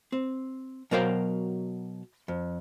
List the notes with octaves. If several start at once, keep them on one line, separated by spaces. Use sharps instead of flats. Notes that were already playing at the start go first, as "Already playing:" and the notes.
C4
B2 F#3 A#4 C5 F5 G5
F2